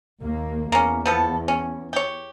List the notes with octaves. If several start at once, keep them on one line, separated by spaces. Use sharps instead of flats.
D#2 A#3
E2 A#3 C#4
F3 B3 A4
C#4
G4 C#5